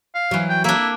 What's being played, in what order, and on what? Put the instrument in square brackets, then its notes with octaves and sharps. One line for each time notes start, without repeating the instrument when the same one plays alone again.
[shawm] F5
[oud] E3 F#3
[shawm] G5
[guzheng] A#3 D4 [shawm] E4